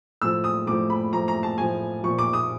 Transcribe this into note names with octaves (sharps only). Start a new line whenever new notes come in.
A2 F3 E6
D#6
A2 F3 D6
B5
A2 F3 A#5
A#5
A5
A2 F3 G#5
A#2 F3 C#6
D6
D#6